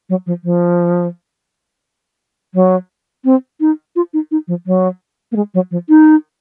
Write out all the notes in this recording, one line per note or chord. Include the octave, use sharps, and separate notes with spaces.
F#3
F3
F3
F#3
C4
D#4
F4
D#4
D#4
F3
F#3
A#3
G#3
F#3
F3
D#4